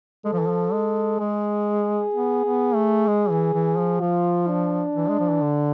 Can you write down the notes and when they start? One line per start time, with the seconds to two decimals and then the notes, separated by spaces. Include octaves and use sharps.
0.25 G#3 A4
0.33 F3
0.40 E3
0.47 F3
0.72 G#3
1.20 G#3 G#4
2.14 B3
2.44 B3
2.75 A3
3.07 G#3
3.30 E3
3.54 E3
3.77 F3
4.01 F3 F4
4.48 D4
4.95 E3
5.09 G#3
5.20 F3
5.31 E3
5.41 D3